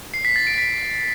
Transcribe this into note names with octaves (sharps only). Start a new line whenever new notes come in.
C7
B6
A6
D7
B6